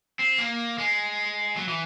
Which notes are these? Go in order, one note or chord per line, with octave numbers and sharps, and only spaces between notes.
C4
A#3
G#3
F#3
E3